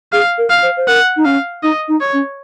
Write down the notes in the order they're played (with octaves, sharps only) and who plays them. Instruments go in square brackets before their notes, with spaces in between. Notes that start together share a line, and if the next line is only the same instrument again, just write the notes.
[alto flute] G#4 [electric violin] F5
[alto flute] A#4
[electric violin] F5
[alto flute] C5
C5
[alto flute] A#4 [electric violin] F#5
[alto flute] D#4
[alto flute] C#4 [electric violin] F5
[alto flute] D#4 [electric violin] D#5
[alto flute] D#4
[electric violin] C#5
[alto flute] C#4